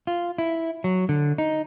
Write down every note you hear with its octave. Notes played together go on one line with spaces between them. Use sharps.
F4
E4
F#3
D3
D#4